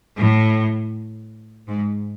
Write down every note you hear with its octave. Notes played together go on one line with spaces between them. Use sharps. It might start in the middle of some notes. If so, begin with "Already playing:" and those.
A2
G#2